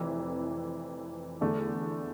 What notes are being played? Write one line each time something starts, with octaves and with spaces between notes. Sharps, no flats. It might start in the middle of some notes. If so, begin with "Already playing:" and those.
Already playing: F1 F2 E3 E4
E2 D3 A3 D4